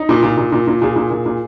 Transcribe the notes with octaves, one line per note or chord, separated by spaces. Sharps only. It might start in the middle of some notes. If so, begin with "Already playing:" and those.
Already playing: D#4
A#2
A#2
A#2
A#2
A#2
A#2 G#4
A#2
A#2
A#2